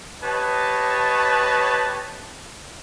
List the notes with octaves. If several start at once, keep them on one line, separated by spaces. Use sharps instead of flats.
G4 B4 C#5 D#5 A5